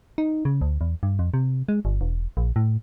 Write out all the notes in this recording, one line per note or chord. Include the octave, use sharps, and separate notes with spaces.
D#4
C#3
D2
E2
G2
F2
C3
G#3
G1
E1
A#1
A2